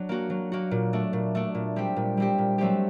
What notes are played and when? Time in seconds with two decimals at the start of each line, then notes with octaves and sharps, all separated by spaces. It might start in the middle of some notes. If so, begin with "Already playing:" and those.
Already playing: F#3 D4
0.09 A#3 F#4
0.30 F#3
0.52 A#3 F#4
0.71 A#2
0.93 A3 D4
1.13 A#2
1.35 A3 D4
1.55 A#2
1.76 G3 C4 G4
1.96 A#2
2.17 G3 C4 G4
2.38 A#2
2.58 F#3 A3 C4 G4